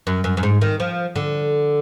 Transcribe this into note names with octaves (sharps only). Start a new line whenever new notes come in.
F#2
F#2
F#2
G#2
D#3
F3
D3